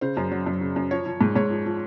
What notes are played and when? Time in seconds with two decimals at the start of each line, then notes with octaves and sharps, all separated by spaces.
0.01 C#3 C5
0.17 F#2
0.31 F#3
0.46 F#2
0.61 C#3
0.76 F#2
0.91 F3 C#5
1.06 F3
1.21 G#2
1.36 G#2 C#5
1.50 F3
1.66 F3